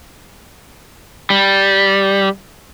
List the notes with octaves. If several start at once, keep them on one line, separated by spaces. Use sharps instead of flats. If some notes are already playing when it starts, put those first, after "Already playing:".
G3